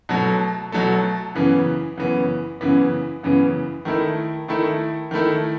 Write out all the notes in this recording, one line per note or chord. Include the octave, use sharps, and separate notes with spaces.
B2 F#3 A3
B2 F#3 A3
F#2 C#3 E3 B3
F#2 C#3 E3 B3
F#2 C#3 E3 B3
F#2 C#3 E3 B3
D#3 A3 E4
D#3 A3 E4
D#3 A3 E4